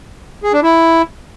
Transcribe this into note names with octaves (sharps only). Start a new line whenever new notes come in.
G#4
D4
E4